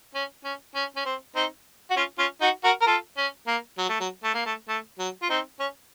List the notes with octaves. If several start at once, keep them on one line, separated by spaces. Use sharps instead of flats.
C#4
C#4
C#4
C#4
C4
C4 D#4
F#4
C#4 F4
C#4 F4
D#4 F#4
F#4 A#4
A#4
F4 A4
C#4
A#3
F#3
A3
F#3
A3
A#3
A3
A3
F#3
F4
C4 D#4
C#4